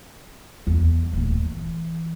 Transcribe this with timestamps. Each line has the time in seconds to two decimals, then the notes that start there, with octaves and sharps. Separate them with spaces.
0.67 E2
1.13 D#1 D2
1.45 E3